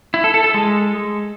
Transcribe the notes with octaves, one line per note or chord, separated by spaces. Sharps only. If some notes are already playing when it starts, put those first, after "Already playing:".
E4
A4
A4
A4
G#3